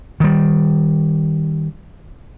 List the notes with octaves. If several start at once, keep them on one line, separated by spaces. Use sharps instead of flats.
D#3 G3